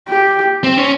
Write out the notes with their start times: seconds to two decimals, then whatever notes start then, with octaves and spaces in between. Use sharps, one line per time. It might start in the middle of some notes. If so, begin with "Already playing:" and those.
0.09 G4
0.64 C4
0.77 C#4